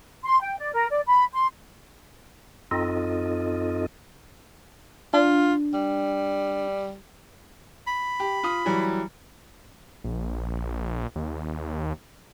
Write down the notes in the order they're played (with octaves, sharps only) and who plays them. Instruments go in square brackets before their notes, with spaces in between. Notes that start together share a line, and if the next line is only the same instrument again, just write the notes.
[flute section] C6
G5
D5
A#4
D5
B5
C6
[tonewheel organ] F#2 C4 D#4 F4 A4 D#5
[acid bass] D4 [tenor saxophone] F4
[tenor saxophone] G3
[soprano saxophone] B5
[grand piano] G4
F4 D#6
E3 F#3 G3
[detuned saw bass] A#1
D#2